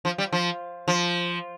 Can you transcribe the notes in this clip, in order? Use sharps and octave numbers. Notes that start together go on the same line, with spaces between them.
F3
G3
F3
F3